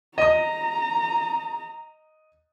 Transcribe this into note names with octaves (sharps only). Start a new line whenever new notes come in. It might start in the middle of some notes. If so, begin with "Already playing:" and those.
D#5 A#5 D#6